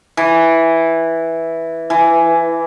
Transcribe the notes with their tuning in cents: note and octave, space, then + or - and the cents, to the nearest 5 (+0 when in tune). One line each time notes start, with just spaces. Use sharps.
E3 -5
E3 +15